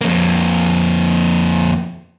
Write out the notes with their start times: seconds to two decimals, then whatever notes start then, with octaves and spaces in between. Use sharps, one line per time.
0.01 F2 A#3